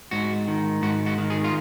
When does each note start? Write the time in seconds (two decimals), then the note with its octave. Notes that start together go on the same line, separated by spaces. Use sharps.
0.11 G#2 F#4
0.48 D#3
0.82 G#2 F#4
1.06 F#4
1.18 D#3
1.30 G#4
1.44 F4